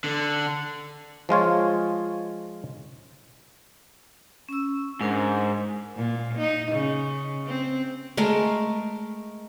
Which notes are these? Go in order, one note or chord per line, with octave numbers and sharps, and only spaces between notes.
D3
F3 G#3 F4 C#5
C#4 E6
G#2 D4 A#4 C5
A#2
D#4
C#3
C4
G#3 A3 A#4